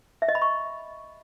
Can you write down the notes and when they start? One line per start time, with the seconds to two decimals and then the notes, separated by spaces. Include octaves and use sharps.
0.22 E5
0.29 D#5
0.35 B5
0.42 C#6